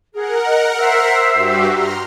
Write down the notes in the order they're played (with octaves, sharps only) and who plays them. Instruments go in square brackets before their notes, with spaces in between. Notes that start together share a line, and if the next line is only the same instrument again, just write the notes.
[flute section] G#4 [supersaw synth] A#4 F#5
[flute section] D#5
C5 E5 E6
[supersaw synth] G2 F#4 G4
A#5 C6 F6